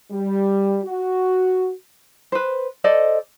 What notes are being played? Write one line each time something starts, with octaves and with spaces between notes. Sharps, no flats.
G3
F#4
B4 C5
A4 C5 D5 D#5